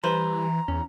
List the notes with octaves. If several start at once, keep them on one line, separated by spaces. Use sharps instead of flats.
E3 G3 B4 C5 A#5
E2 C#4